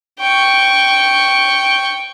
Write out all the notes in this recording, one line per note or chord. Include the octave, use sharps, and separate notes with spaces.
G5 C#6